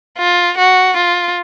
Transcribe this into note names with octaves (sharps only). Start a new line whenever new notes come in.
F4
F#4
F4